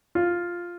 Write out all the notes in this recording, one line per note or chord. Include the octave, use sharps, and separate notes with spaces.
F4